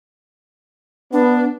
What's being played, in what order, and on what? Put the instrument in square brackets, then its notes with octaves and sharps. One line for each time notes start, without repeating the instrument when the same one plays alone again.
[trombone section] B3 [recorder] D4